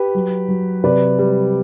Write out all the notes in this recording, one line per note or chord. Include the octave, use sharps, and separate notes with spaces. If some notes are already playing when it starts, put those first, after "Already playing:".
Already playing: G4 B4
F#3
F#3
C3 B4 D5
G3